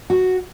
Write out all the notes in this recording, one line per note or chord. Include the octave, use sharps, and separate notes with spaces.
F#4